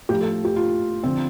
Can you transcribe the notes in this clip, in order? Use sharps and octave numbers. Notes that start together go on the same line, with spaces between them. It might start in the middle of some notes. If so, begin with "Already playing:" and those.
A2 F3 G4
A4
G4
F4
D3 F3 C4